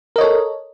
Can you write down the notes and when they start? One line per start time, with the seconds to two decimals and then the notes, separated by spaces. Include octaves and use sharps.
0.16 A#4
0.18 D#5
0.21 C#5
0.23 A4